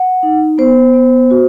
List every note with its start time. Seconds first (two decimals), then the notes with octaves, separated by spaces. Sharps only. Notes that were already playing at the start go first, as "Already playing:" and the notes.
Already playing: F#5
0.23 D#4
0.58 B3 C5
0.94 B3
1.31 F#4